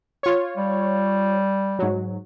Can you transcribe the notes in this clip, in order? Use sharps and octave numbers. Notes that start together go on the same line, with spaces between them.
F4 C#5
G3
G#2 F#3